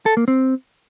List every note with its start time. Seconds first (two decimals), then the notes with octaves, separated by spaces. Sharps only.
0.06 A4
0.17 A#3
0.28 C4